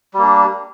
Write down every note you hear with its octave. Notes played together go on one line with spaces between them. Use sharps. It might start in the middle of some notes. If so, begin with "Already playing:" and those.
G3 A#3 D4